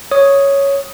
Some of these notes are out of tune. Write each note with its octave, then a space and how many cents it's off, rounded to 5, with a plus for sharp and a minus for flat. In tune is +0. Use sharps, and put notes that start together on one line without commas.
C#5 +0 D#6 +5